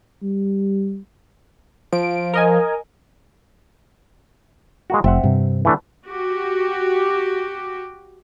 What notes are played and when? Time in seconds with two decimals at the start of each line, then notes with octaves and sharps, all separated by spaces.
0.22 G3
1.93 F3 D7
2.34 A#4 D#5 G#5
4.90 G#3 A#3 F#4
5.04 F1 C4 E5 F#5
5.23 G2 C3
5.65 E3 A3 D4
6.06 F#4 G4